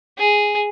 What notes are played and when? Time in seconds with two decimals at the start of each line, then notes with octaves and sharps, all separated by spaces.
0.18 G#4